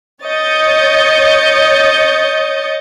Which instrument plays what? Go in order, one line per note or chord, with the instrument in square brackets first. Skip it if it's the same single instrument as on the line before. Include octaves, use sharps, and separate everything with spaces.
[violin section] C#5 D#5 D#6 G6 A6 C#7